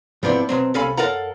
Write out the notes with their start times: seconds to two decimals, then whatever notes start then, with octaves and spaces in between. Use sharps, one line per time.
0.23 G#2 F3 B3 C4 D4 E4
0.49 B2 F#3 C4
0.74 C2 C#4 A4 F5 G#5 B5
0.97 F#2 A4 A#4 F5 F#5 A#5